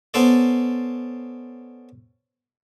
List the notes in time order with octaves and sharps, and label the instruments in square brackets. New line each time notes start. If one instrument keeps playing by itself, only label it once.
[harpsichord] B3 C#4 A4 C5 D5